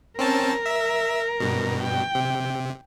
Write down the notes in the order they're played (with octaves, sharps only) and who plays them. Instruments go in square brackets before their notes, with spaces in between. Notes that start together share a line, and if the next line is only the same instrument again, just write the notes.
[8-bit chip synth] C4 C#4 A5 [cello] A#4
[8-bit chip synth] E5
G2 B2
[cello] G5
[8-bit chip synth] C3